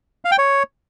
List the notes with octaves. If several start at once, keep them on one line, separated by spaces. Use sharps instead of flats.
F5
G5
C#5